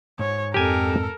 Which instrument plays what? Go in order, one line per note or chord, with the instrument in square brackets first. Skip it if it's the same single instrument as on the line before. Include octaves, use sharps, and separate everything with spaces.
[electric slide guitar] G#2 [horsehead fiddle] C#5
[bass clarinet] F2 [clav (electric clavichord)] G4 G#5 [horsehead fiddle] A4 A#4